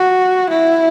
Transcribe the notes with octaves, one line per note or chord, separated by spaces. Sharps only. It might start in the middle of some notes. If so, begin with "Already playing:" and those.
Already playing: F#4
E4